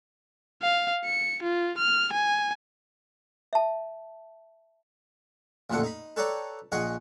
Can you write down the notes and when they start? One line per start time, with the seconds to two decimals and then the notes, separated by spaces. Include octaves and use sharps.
0.62 F5
1.05 C#7
1.43 F4
1.78 F6
2.13 G#5
3.53 E5 A5
5.70 A1 F2 A#2 D3 A4 F#5
5.83 D#4 B5
6.16 A4 B4 C#5 D5 G5 A#5
6.72 A#1 G#4 D#5 F#5 C#6